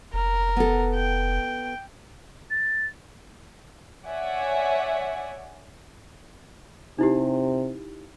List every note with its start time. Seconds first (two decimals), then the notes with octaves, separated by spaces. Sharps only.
0.14 F1 A#4
0.56 B3 A4
0.95 G5
2.50 A6
4.08 C#5 D5 E5 F#5 G#5
6.99 C3 D#4 E4 G4